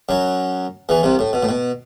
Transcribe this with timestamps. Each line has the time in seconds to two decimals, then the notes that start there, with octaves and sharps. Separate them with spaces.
0.09 F#2 F#3
0.89 E2 E3
1.03 C2 C3
1.19 A2
1.33 B2
1.43 A2
1.49 B2